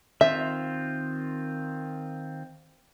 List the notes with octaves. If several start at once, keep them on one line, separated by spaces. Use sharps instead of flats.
D#3 C4 F4 E5